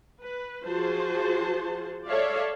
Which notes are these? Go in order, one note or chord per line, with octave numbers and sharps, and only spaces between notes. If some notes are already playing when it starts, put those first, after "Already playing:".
B4
F3 F#4 G#4 C5 A5
A4 C#5 D5 E5 F5